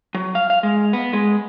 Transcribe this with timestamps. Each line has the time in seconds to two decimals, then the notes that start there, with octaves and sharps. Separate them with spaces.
0.15 F#3
0.35 F5
0.50 F5
0.63 G#3
0.93 B3
1.13 G#3